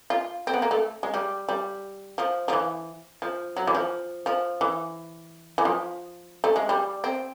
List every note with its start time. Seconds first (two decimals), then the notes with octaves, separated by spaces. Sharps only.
0.10 F4
0.47 C4
0.54 B3
0.62 A#3
0.71 A3
1.03 G#3
1.14 G3
1.49 G3
2.18 F3
2.48 F3
2.53 E3
3.22 F3
3.57 F#3
3.67 E3
3.75 F3
4.26 F3
4.61 E3
5.58 E3
5.65 F3
6.44 A3
6.56 G#3
6.69 G3
7.04 C4